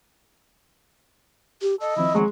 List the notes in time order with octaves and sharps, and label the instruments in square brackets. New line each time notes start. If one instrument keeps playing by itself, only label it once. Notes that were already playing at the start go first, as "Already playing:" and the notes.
[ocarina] G4
[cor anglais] A4 [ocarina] D#5
[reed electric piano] D#3 F3 C4 [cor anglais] E4
[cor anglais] F#3 [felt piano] G#3